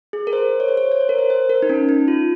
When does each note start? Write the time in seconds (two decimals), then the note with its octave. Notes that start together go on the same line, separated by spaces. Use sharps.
0.13 G#4
0.27 A#4
0.33 C5
0.60 C#5
0.68 C5
0.77 C#5
0.92 C#5
1.01 C5
1.09 A#4
1.19 C5
1.30 C5
1.50 A#4
1.62 D#4
1.69 C#4
1.89 D#4
2.08 F4